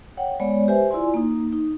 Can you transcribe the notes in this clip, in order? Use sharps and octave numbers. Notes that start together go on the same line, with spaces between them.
C#5 F#5 G5
G#3 B3 C#5 D5
G4 B4 C5 E5 G#5
E4 F4 D5 G#5 C6
A#3 D#4
D#4